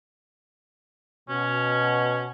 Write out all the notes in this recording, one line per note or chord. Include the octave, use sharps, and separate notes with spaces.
B2 C#4